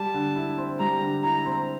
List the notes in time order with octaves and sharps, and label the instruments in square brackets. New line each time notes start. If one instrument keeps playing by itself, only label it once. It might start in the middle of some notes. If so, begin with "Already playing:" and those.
Already playing: [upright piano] G3 [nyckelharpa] A5
[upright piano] D3
E4
C4
[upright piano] G3 [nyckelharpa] A#5
[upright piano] D3
[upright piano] E4 [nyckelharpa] A#5
[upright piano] C4